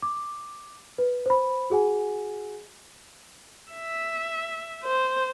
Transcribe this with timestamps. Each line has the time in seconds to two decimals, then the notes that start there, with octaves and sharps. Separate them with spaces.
0.02 D6
0.98 B4
1.26 C5 B5
1.70 F#4 G#4 F#5 G#5
3.72 E5
4.84 C5